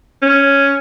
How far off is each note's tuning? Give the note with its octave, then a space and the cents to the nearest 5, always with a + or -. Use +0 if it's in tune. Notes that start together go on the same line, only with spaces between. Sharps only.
C#4 +0